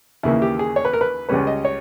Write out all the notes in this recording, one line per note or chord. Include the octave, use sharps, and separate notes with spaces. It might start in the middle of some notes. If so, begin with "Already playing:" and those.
D#2 C#3 E3 A#3 E4
G4
G#4
C#5
B4
A#4
B4
C#2 C#3 G3 C#4 B4
D#5
C#5